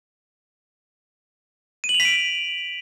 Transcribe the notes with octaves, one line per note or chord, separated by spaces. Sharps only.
D#7
F#7
F7
B6
D7